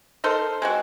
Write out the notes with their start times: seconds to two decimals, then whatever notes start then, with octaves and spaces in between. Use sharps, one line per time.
0.24 D#4 A4 A#4 C5
0.62 G#3 C4 F#4